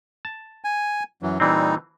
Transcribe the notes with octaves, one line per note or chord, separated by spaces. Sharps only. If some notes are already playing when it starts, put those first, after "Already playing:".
A5
G#5
F#2 E3 F#3
A#2 E3 G3 C4 D#4